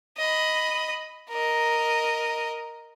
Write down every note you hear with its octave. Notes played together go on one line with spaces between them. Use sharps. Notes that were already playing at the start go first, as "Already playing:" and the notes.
D#5 B5
A#4 D#5